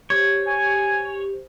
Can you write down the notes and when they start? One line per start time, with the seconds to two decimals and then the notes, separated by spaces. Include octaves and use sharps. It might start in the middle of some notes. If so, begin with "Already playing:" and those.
0.10 G4 C5 C#5
0.47 G#5